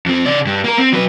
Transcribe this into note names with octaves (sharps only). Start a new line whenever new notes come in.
F2 C4
C#3 D5
G2
A#3 A#4
C4
F#3 B4